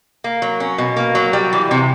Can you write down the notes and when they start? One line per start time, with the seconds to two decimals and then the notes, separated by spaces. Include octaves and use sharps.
0.24 A#3
0.42 F#3
0.60 C#4
0.78 B2
0.96 A#3
1.15 F#3
1.33 G3
1.53 E3
1.71 C3